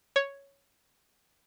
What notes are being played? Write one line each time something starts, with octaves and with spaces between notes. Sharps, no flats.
C#5